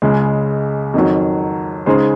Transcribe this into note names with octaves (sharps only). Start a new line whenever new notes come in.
C#2 C#3 G#3
F2 D#3 F#3
C#3 G#3 D#4 G#4 C5